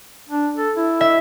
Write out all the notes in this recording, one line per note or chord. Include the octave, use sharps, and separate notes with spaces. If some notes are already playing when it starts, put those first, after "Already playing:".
D4
A4
E4
E5